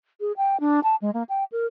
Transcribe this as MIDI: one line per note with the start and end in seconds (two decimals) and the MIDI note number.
0.21 0.32 68
0.37 0.59 79
0.60 0.80 62
0.84 0.96 81
1.02 1.10 56
1.14 1.23 58
1.29 1.44 79
1.52 1.66 70